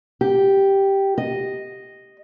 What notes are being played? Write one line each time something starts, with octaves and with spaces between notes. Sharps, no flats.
G4
D#5